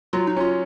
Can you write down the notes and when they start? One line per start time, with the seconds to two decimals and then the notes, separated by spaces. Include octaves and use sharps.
0.13 F#3 F4
0.27 D#4
0.37 C#4 F4